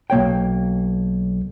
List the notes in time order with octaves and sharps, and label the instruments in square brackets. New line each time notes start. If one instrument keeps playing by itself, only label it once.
[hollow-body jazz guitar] B1 A#3 C#5 G5